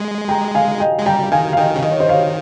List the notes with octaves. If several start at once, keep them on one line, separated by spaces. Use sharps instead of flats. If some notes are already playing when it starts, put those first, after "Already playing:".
Already playing: G#3
G5 A#5
F5 G#5
D#5 G5
G#3
G3 G5 A#5
D#3 F5 G#5
F5
D#3 D#5 G5
C#3
D#3 D#5
C#5
C5 D#5
C#5 F5